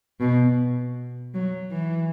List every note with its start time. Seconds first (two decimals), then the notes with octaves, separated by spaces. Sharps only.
0.20 B2
1.34 F#3
1.72 E3